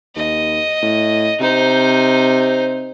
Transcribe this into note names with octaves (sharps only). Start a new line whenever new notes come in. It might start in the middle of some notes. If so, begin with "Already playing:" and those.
D#2 D#5
A2
C3 D#4 C5